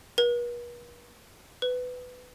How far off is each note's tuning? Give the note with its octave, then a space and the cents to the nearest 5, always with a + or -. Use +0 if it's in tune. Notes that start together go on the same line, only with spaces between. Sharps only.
B4 -45
B4 +15